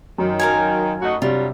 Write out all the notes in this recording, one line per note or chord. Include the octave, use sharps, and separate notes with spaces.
F#2 D#3
A#4 F5 G#5
A3 D#4 F#4
G2 C3 F#3 G3 F4